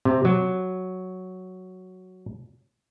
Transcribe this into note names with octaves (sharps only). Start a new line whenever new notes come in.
C3
F#3